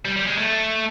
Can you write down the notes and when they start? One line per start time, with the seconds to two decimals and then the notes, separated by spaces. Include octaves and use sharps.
0.05 G3
0.16 G3
0.26 G#3
0.38 A3